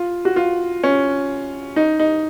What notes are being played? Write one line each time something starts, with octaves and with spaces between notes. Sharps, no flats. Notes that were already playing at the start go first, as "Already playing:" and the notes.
Already playing: F4
F#4
F4
C#4
D#4
D#4